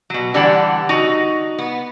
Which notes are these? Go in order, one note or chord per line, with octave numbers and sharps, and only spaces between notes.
B2 F#3
D3 E3 G3 A4 F#5
D#4 F#4 D#5
B3